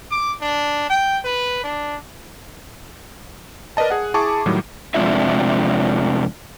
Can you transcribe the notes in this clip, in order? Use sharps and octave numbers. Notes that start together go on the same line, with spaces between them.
D6
D4
G5
B4
D4
A#4 B4 D5 D#5 A5
G#4 F#5
E4 G#4 A5 C#6 D6
A2 D#3 F#3 G3
F2 C3 G#3 D4 F4 E5